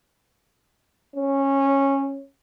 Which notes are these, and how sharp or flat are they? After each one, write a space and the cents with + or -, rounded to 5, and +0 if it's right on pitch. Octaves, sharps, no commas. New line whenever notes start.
C#4 -15